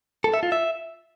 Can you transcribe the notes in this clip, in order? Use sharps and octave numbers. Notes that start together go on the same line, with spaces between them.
A4
E5
F4
E5